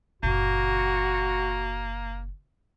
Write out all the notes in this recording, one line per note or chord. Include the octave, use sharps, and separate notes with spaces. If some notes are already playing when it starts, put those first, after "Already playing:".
F#1 A#2 A#3 F#4